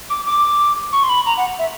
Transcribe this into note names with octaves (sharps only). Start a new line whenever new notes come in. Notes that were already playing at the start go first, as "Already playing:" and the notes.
D6
D6
C#6
C6
B5
A#5
F#5
E5